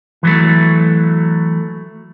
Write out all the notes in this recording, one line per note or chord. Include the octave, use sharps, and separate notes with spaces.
E3 F#3 A3